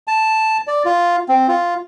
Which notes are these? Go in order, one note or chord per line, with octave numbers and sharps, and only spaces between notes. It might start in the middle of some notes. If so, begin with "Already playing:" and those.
A5
D5
F4
C4
F4